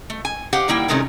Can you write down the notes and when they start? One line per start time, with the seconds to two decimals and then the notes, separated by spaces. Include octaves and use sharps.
0.10 A3
0.25 G#5
0.53 G4 C5 F5 F#5
0.68 D#3 G3 A#3 E4 G5
0.88 C3 D#3 G#3 A3 B3 C#4